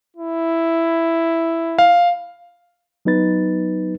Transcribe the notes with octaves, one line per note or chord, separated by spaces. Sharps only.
E4
F5
F#3 B3 D#4 B4 A6